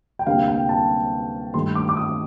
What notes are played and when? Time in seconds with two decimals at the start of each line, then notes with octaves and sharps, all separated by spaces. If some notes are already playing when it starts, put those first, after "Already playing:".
0.19 G5
0.26 D2 C3 G3 A#3 F5
0.48 G5
0.69 A5
1.54 G2 D#3 A3 C6
1.75 D6
1.89 D6
1.97 D#6